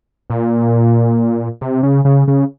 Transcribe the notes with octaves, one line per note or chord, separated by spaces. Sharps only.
A#2
C3
C#3
C#3
C#3